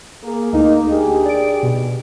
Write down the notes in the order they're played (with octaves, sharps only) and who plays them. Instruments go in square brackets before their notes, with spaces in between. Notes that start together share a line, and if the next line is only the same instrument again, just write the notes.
[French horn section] A#3 G#4 A#4
[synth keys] D2 D#4 [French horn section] A#3 D#5
[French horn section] D4 G4 G#4
[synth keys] D5 D7
B2